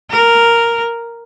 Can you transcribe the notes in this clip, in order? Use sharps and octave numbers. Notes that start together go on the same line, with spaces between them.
A#4